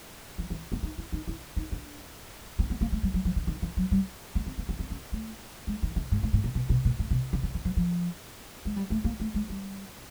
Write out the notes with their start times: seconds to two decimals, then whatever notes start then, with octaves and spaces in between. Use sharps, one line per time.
0.38 E3
0.50 E3
0.72 B3
0.83 D#4
0.98 E4
1.12 D#4
1.27 E4
1.57 D#4
1.72 D4
2.59 C4
2.70 B3
2.81 A#3
2.92 A3
3.03 G3
3.14 F#3
3.25 F3
3.36 D3
3.47 D#3
3.62 E3
3.77 F#3
3.91 G3
4.35 B3
4.46 C4
4.58 B3
4.69 C4
4.79 C4
4.90 C#4
5.12 A3
5.67 G#3
5.83 D#3
5.96 D3
6.11 G#2
6.23 A2
6.33 A2
6.44 A#2
6.55 B2
6.69 B2
6.85 A#2
6.99 A2
7.11 B2
7.33 C#3
7.43 D3
7.54 E3
7.65 F3
7.77 F3
8.65 G#3
8.76 G3
8.90 A3
9.04 A#3
9.20 A3
9.34 G#3
9.50 G3